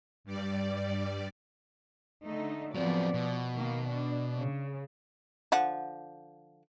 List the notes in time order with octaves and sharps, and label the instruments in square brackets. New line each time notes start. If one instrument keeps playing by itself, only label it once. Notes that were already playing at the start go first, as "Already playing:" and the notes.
[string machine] G2 G3 D5
[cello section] D3 A3 D#4
[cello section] F3 B3 D5 [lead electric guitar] F#3 C4
[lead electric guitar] B2
[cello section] D#3 A#3
D4
C#3
[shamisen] D3 F3 F#5